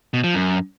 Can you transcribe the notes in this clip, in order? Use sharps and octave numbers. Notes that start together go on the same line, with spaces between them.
B2
F3
F#2